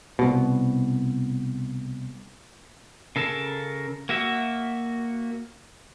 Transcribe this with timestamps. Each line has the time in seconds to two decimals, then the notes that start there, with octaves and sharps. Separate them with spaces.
0.19 C2 B2
3.16 C#3 A4 A#4 A5
4.09 A#3 F#4 E5